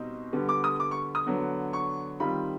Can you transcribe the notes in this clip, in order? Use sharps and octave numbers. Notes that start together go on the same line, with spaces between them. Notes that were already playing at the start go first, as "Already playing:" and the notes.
Already playing: B2 G3 C4 D#4
D3 G3 B3
D6
D#6
D6
C#6
D#6
D3 F#3 B3
C#6
D#3 G3 C4 F4 B5